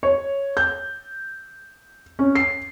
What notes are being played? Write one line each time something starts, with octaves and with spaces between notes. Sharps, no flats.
C#5
G6
C#4
C7